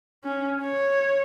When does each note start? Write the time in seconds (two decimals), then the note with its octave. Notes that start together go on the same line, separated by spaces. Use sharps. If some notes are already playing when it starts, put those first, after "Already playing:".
0.24 C#4
0.62 C#5